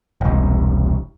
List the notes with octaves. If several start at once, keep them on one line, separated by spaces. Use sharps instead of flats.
E1 C2